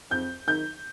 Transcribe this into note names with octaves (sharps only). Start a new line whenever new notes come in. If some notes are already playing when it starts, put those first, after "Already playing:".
F2 G6
D#3 G6